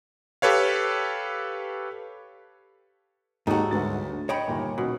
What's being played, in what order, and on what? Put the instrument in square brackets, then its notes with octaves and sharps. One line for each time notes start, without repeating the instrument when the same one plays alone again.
[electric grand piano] G4 A4 B4 C#5 F5
[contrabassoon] D#2 [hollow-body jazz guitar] G#2 F#4 [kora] D#4 A4 [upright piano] F#5 G5
[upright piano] G1 B4 A6 [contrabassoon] D2
[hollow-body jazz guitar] C#5 G5 B5 [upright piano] D#5 C#7
[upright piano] G1 A#2 [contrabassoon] D#2
[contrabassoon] D#1 [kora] B2